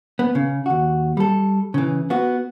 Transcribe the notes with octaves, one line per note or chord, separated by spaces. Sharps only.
B3
C#3
D#2 F#4
G3 A4
C#3 E3
B3 F#4